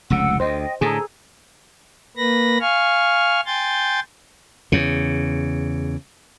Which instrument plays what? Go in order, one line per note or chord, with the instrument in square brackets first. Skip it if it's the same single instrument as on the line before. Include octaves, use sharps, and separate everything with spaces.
[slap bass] F1 C#2 C#3 [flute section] F#5 E6
[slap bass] D2 [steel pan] C5 [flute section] D#5 G5
[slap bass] A2 D3 [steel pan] G#4 [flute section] A4 A#5
[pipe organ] A#3 B4 B5 A#6
F5 G#5 C#6 F6
G5 G#5 C6 G6 A6
[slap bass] E2 C#3